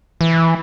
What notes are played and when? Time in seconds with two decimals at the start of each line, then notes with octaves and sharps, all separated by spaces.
0.21 E3